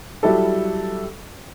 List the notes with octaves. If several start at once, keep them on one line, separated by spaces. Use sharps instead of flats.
F#3 G3 E4 G4 A4